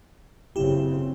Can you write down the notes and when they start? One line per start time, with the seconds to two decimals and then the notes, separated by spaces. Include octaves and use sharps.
0.56 F#1 C#3 C4 E4 G4